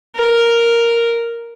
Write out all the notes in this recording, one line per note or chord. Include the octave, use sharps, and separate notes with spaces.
A#4